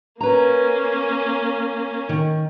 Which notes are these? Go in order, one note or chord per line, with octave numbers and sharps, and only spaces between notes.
A#3 C#4 B4 A#5
D#3